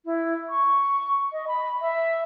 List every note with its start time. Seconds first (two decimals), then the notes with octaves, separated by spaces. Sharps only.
0.05 E4
0.49 C#6
1.32 D#5
1.48 B5
1.81 E5